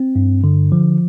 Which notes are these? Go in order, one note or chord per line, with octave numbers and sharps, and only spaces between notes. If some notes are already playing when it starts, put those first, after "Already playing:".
Already playing: C4
G2
D3
F3